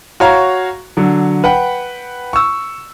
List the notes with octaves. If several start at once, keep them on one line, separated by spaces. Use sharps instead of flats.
F#4 C#5 F5 A#5 C#6
D3 F#3
B4 F#5 G5
C#6 E6